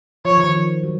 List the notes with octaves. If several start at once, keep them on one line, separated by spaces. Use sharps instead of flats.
F3 C#5
D#3
F3
F#3